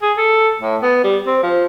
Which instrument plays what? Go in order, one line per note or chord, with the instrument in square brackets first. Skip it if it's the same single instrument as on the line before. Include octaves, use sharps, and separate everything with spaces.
[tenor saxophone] G#4
A4
A2
B3
G3
C4
F3